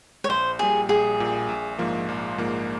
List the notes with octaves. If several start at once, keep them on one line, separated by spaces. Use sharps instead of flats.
C#5
A#1 C5
A#2 G3 G#4
A#1 G#4
A#2 G3
A#1
G#2 F3 A#3
A#1
G#2 F3 A#3